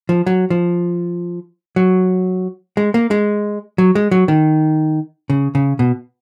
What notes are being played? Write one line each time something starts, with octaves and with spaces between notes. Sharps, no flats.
F3
F#3
F3
F#3
G#3
A#3
G#3
F#3
G#3
F#3
D#3
C#3
C#3
B2